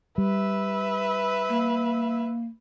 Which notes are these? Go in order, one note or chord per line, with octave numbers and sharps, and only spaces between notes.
G3 B4 E5
A#3